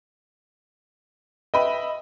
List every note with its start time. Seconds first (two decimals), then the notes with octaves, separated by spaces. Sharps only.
1.54 B4 D#5 E5 G5 B5 D#7